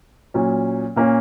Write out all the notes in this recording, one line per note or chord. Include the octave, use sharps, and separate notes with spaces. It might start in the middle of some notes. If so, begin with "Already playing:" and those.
A#2 F#3 C#4
A#2 A#3 C#4